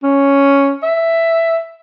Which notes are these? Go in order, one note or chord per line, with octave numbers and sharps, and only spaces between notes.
C#4
E5